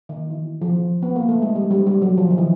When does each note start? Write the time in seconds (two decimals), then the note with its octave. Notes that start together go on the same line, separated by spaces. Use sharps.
0.09 D#3
0.30 E3
0.62 F3
1.02 B3
1.16 A#3
1.29 A3
1.42 G#3
1.55 G3
1.71 G3
1.87 G3
2.02 F#3
2.18 F3
2.30 D#3
2.38 E3